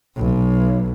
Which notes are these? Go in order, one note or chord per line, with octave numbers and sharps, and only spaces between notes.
B1